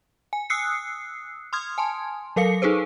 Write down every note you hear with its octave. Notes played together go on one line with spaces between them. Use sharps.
G#5
D#6 E6 F#6 C7 C#7
C6 D#6 F6 G#6
G#5 A5 C6
F#3 A4 A#4 F5 C#7
D#4 G#4 A4 B4 C5